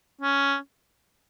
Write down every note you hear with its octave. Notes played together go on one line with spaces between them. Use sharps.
C#4